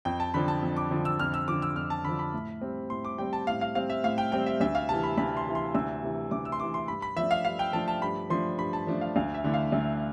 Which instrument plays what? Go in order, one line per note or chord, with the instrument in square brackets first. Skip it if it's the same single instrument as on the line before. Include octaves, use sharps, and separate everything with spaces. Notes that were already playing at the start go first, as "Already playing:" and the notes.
[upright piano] F2 [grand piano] G5
[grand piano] A5
[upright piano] D3 F3 [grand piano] B5
[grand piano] A5
[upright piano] F2
[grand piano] D6
[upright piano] D3 F3
[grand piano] E6
[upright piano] F2 [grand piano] F6
[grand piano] E6
[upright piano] D3 F3 [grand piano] D6
[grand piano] E6
[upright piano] F2 [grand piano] F6
[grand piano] A5
[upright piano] D3 F3 [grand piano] B5
[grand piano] B5
[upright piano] A2
G3 C4
[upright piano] A2 [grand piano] C6
[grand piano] D6
[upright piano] G3 C4 [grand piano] G5
[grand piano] A5
[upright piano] A2 [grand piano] F5
[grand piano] F5
[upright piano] G3 C4 [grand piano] F5
[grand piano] E5
[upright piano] A2 [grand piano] F5
[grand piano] G5
[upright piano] G3 C4 [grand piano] G5
[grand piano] E5
[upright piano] D2 [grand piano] E5
[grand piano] F5
[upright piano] C3 E3 [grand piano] A5
[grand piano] B5
[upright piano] D2 [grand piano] B5
[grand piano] C6
[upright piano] C3 E3
[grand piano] C6
[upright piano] D2 [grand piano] E6
[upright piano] C3 E3
[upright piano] D2 [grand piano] D6
[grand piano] E6
C6
[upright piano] C3 E3 [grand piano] D6
[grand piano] C6
[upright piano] G2 [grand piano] B5
[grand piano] B5
[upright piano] F3 A3 D4 [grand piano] E5
[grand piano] F5
[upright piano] G2 [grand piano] F5
[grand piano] G5
[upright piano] F3 A3 D4 [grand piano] A5
[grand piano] A5
[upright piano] G2 [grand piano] B5
[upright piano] F3 A3 D4 [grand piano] C6
[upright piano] G2 [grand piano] B5
[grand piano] A5
[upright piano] F3 A3 D4
[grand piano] F5
[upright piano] D2 [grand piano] F5
[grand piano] E5
[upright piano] D3 A3 E4
[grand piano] F5
[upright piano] D2